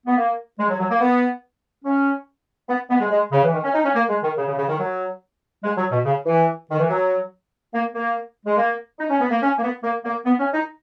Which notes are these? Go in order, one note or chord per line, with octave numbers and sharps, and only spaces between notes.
B3
A#3
G#3
F#3
F#3
A#3
B3
C#4
B3
B3
G#3
G#3
C#3
E3
D#3
C#4
D#4
C#4
A#3
G#3
D#3
C#3
C#3
C#3
D#3
F#3
G#3
F#3
B2
C#3
E3
D#3
E3
F#3
A#3
A#3
G#3
A#3
D#4
C#4
B3
A#3
C#4
A#3
B3
A#3
A#3
B3
C#4
D#4